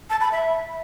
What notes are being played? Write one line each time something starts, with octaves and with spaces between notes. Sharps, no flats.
A5
B5
E5